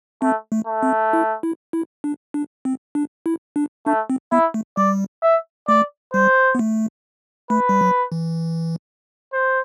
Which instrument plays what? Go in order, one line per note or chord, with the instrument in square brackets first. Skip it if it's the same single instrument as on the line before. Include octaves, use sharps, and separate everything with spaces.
[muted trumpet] A3 [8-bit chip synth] C4
[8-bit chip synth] A3
[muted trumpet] A3
[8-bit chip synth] C4
E4
E4
E4
D4
D4
C4
D4
E4
D4
[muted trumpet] A3 [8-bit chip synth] D4
[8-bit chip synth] C4
[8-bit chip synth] B3 [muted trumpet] E4
[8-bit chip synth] A3
[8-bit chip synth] G3 [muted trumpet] D5
[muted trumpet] E5
[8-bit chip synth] A3 [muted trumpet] D5
[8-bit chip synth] G3 [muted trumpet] C5
[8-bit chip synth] B3
A3
[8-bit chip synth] A3 [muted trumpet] B4
[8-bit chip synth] G3
F#3
E3
[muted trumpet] C5